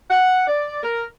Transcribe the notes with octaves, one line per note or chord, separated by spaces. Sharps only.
F#5
D5
A#4